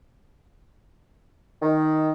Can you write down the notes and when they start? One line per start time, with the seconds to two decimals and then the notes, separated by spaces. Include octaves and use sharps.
1.62 D#3